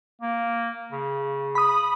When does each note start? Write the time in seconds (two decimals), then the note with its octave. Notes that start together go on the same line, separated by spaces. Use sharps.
0.21 A#3
0.92 C#3
1.55 B5 D#6